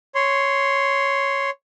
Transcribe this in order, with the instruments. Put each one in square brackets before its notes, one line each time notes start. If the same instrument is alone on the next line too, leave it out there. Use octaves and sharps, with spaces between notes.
[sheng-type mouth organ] C#5 C6